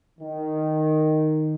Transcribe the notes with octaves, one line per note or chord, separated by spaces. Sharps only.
D#3